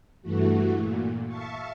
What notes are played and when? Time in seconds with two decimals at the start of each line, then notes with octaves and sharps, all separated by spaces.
0.22 G2 E3 A3 F#4
0.76 A#2
1.26 E5 F5 A5 C#6